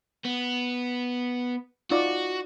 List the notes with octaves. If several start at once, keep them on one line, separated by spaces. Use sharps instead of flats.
B3
D#4 F4 F#4 D5